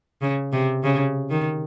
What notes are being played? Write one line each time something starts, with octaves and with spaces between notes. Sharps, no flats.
C#3
C3
C#3
D#3